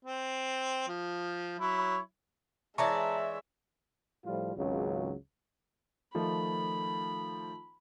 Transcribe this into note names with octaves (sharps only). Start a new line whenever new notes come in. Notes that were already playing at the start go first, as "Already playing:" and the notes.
C4
F3
F#3 E4 C#5
E3 G#3 C#5 D5 E5 A5 A#5 C#6
A2 F3 G3 F4
G#1 C#2 C#3 F#3
D#3 F3 A3 B5